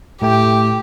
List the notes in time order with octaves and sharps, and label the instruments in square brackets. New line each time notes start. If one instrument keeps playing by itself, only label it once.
[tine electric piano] A2 A3 G5 [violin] G4